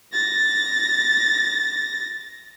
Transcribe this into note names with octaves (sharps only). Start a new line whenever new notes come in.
A6 A#6